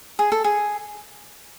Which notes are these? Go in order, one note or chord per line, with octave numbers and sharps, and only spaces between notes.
G#4
A4
G#4